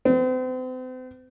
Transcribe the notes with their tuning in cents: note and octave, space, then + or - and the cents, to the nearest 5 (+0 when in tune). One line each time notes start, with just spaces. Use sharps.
C4 -40